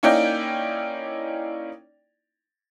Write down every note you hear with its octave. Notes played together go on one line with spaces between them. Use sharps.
A#3 C#4 D#4 E4 D5 G5